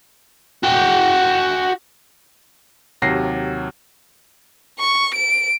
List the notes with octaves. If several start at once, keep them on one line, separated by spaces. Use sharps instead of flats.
F#4 G5
D#2 C3 F#3 A#6 C7
C#6
D7